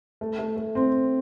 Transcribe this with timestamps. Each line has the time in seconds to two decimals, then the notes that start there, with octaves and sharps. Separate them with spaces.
0.21 A3
0.39 A3
0.57 A3
0.75 C4